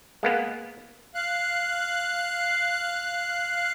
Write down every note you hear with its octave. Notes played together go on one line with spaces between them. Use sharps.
G#3 A#3 B3
F5 F#6